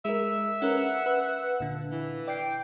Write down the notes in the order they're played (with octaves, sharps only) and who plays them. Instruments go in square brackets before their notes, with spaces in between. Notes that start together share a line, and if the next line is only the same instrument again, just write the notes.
[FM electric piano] G#3 A#4 [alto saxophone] E5
[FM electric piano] C#4 A#4 B4 [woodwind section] F#5
[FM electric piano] B4
A#2 D3
[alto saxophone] E3
[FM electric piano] D5 C7 [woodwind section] G5